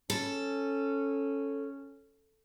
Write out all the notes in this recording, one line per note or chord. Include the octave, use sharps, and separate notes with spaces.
C#4 A4